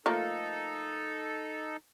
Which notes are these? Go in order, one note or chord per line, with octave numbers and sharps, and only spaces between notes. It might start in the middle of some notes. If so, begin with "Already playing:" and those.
F3 A3 A#3 D#4 A4